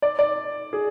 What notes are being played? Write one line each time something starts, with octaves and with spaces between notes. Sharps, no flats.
D5
D5
G#4